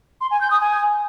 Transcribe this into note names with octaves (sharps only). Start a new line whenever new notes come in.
C6
G#5
G6
D#6
G#5